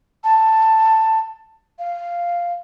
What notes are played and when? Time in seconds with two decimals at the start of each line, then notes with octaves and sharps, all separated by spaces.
0.24 A5
1.79 F5